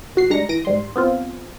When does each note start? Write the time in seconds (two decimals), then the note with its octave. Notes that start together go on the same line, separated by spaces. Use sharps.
0.16 A1 F#4 C7
0.30 G3 G#3 D4 A#5 A#6 C#7
0.49 E3 A#6 D7 D#7
0.65 G#2 G3 C6
0.96 B3 C4 F4